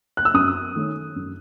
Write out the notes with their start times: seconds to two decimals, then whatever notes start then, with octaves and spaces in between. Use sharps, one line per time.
0.17 F#6
0.25 E6
0.34 F#2 D#6
0.75 D#3 A3 C#4
1.16 F#2